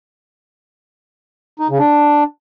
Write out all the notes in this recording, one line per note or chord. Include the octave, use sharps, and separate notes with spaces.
D#4
C#3
D4